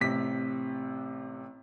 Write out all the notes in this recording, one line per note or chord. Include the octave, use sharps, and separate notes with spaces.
A1 C3 B6